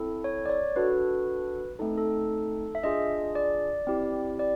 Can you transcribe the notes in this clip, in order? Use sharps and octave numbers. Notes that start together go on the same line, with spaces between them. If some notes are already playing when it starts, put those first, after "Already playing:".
Already playing: C4 E4 A4
C#5
D5
C#5
D4 F#4 A4 B4
A3 C4 D#4 A4
A4
E5
D4 F4 G#4 D#5
D5
C4 E4 G4
D5